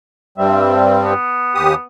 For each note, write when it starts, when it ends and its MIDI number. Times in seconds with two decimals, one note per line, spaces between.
0.38 1.14 43
0.38 1.14 55
0.38 1.14 60
0.38 0.87 76
1.03 1.84 59
1.55 1.75 39
1.55 1.75 67
1.55 1.75 87